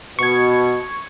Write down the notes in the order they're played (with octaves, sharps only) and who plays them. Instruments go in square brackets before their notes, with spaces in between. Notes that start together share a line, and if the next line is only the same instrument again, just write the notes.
[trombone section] B2 [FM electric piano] C#6 G#6